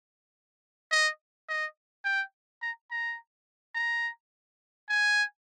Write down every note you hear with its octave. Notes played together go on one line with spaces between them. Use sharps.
D#5
D#5
G5
A#5
A#5
A#5
G#5